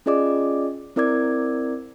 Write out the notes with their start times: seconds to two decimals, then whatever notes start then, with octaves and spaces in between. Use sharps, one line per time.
0.06 C#4 F4 G#4 D5 D#5 D6
0.96 C4 E4 A#4 D5 D6 G#6